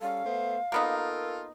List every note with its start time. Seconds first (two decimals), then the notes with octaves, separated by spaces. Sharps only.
0.01 G3 C#4 A4 F5
0.25 A3 B3 C5
0.72 A#3 B3 D#4 F4 A4 A#4